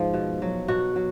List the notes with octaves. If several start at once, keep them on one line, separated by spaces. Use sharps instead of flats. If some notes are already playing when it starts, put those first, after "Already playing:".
Already playing: G#2 F3
B2
F#3
B2 F#4
F#3